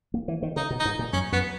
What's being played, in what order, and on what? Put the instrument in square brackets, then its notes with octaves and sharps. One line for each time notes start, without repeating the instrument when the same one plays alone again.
[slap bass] A#3
E3
D#3
[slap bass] C#3 [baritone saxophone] D#4
[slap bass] B2
[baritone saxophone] D#4
[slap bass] G#2
A#2
[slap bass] F#2 [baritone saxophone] C#4
[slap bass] F#2 [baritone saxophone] B3